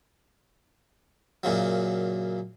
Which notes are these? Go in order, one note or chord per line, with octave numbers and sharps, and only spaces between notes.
F#2 A#2 C#3 F#3